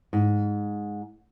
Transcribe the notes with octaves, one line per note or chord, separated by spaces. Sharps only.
G#2